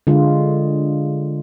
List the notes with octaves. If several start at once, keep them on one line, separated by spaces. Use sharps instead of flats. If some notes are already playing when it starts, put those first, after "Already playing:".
D3 G#3 F4